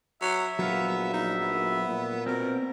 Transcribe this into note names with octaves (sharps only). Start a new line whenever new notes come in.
F#3 E5
A#1 F#3 B3 F5
D#4
B3
A#2
B2 C4 A#4